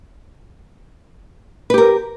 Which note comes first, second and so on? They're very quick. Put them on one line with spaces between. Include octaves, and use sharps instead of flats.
B4 G4 A#4